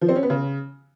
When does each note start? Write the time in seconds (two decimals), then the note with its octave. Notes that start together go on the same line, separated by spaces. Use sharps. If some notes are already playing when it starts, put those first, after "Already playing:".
0.01 F3
0.09 C4
0.16 C#4
0.23 B3
0.30 C#3